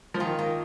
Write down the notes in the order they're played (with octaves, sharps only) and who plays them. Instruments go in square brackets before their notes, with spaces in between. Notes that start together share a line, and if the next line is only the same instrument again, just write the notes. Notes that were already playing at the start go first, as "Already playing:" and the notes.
[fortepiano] F3
[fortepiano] D#3 [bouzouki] F4
[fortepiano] D#3 [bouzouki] A#3